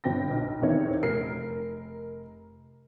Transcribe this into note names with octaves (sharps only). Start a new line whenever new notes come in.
G1 C4 G5 A#6
B1
E2 C3 D#3 C4 C#5
F1 A#4 C7